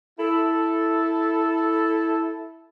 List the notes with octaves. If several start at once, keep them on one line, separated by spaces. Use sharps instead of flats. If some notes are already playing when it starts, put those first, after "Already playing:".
E4 A4